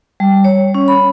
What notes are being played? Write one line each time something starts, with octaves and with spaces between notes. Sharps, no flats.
G3
C#5
C#4
B5